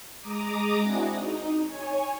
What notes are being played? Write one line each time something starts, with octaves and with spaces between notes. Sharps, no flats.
G#3 A#5 D6 D#6
C4 D4 E4 F#4 G#4
D#4
C#5 G#5